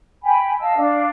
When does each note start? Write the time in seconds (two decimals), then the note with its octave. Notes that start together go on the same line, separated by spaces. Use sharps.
0.23 G5 G#5 B5
0.60 D#5 F5 A5 E6
0.76 D4 F5